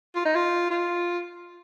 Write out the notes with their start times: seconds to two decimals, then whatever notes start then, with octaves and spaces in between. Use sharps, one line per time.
0.16 F4
0.25 D#4
0.36 F4
0.70 F4